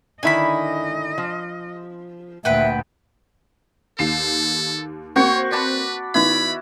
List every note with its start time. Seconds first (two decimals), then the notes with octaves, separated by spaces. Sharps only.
0.23 D3 D#3 E4 D#5 G#5 B5
1.18 F3
2.45 D2 A#2 B4 E5 F#5 G5
3.99 D#2 A4 C7 E7
5.16 A#3 C4 F#4 C5 C#5 C#6
5.51 B4 D5 A5 B5
6.14 D#3 B3 D#4 E4 B5